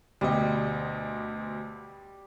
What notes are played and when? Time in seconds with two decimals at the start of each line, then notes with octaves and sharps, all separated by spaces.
0.21 D2 B2 G3 D#5